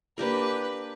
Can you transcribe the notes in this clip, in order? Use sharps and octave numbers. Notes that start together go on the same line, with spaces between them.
A#3 D4 G4 A#4 B4